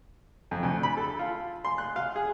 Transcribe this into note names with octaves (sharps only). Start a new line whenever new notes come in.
F2
D2
B5
A4
F4
C6
F#6
F5
G#4